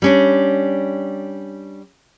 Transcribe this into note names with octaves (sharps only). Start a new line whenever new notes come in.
G3 C#4 D4